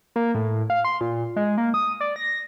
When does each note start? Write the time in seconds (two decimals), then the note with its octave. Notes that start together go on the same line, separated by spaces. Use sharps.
0.16 A#3
0.35 A2
0.70 F5
0.85 C6
1.01 A#2
1.36 G#3
1.58 A#3
1.74 D#6
2.01 D5
2.16 A#6